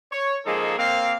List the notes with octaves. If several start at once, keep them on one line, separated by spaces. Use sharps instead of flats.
C#5
F3 G#3 A#3 D#4 G#4 A4
A#3 C4 F5